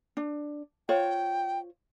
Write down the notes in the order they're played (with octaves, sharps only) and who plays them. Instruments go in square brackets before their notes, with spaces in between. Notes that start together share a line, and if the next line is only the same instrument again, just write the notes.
[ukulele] D4
[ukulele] F4 C5 C#5 [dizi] G5